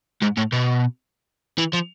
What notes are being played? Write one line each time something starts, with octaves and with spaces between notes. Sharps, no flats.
G#2
A2
B2
E3
F3